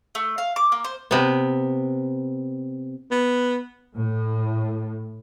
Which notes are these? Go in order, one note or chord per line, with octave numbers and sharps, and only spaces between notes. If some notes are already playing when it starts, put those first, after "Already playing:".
A3
F5
D6
A#3
C5
C3 B3
B3
A2